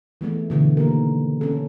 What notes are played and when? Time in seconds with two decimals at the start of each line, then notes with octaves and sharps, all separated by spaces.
0.21 E3 G#3 A3 B3
0.50 B2 D3 E3
0.77 D#3 A#3 G4 A#4
1.41 C#4 A4